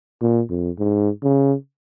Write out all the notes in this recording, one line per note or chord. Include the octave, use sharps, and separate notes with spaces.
A#2
F2
G#2
C#3